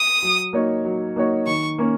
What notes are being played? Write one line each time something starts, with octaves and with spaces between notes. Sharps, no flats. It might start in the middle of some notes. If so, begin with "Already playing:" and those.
Already playing: D#6
F#3
A#3 D#4 F#4 C#5
F#3
A#3 D#4 F#4 C#5
D#3 C#6
A#3 C#4